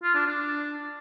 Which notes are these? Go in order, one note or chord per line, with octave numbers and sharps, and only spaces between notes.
F4
D4
D4